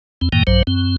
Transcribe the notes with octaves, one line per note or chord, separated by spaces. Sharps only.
E2 C4
F#2 A2 D#3 A#3 G5
A#1 G2 F#3 C5
F#2 C4